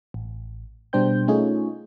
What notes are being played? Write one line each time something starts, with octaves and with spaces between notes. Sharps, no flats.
A1
B2 G3 D4 C5 G5 G6
A3 C#4 D#4 F4 G#4 C#5